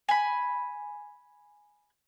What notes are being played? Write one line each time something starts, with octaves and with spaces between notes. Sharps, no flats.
G#5 B5